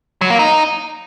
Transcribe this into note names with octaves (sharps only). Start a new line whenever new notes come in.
F#3
A#3
D#4